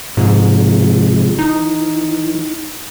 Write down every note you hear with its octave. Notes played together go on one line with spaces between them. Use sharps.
G#2 C3 F3 G#3
E3 D#4